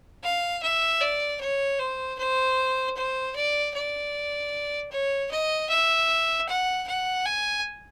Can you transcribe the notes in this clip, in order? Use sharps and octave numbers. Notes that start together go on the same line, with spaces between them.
F5
E5
D5
C#5
C5
C5
C5
D5
D5
C#5
D#5
E5
F#5
F#5
G#5